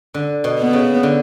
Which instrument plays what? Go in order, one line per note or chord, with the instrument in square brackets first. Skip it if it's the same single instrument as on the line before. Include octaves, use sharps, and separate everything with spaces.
[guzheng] D3
B2
[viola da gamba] B3
[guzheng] C#3
D3